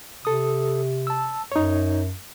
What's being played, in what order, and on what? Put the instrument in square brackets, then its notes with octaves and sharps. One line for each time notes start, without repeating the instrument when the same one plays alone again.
[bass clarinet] C3 [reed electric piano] A4 D#6
[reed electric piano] A5 E6
[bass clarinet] F#2 [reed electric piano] D#4 C#5